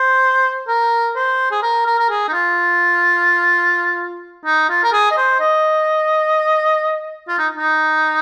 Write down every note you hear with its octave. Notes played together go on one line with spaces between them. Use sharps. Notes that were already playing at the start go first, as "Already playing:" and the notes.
Already playing: C5
A#4
C5
G#4
A#4
A#4
A#4
G#4
D#4
F4
D#4
F4
A#4
G#4
D#5
C5
D#5
F4
D#4
D#4